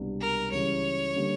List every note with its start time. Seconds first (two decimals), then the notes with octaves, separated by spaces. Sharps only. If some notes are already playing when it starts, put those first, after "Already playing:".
Already playing: C2 B2 G#3 B3 D4
0.21 A#4
0.51 C#2 C#3 E3 G3 C#5
1.16 D3 G3 A#3